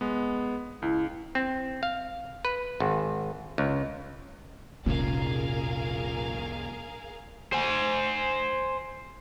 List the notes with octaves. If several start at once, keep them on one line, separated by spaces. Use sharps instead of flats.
G#3 B3
C#2 E4
C4
F5
B4
G#1
C#2
F1 C2 A#2 C#4 G#4 A#4 F5
C5 G#5